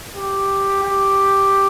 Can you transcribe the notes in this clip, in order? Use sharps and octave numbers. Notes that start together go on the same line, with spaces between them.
G4
G4